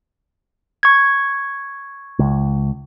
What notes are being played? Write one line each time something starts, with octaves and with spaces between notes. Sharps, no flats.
C#6 G#6
C#2